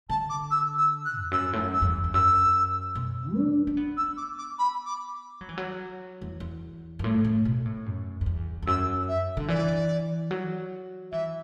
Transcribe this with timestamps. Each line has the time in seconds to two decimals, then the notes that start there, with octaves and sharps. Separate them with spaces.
0.09 D3 A5
0.30 D6
0.51 E6
0.78 E6
1.05 F#6
1.21 E2
1.31 F#2 E6
1.53 A2
1.59 F#2
1.73 E6
1.82 F#2
1.87 E2
2.04 E2
2.14 F#2 E6
2.95 B2
3.36 D4
3.67 D4
3.77 B3
3.97 E6
4.17 D6
4.38 D6
4.59 B5
4.86 D6
5.41 F#3
5.49 E3
5.58 F#3
6.22 E2
6.40 E2
6.99 F#2
7.04 A2
7.25 A2
7.45 B2
7.66 A2
7.86 F#2
8.21 F#2
8.26 E2
8.62 E2
8.67 F#2 E6
9.08 E5
9.37 D3
9.48 E3 D5
10.31 F#3
11.12 E3 E5